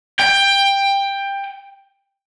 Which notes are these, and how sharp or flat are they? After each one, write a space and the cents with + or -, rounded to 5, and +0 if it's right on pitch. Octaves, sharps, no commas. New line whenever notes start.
G5 +15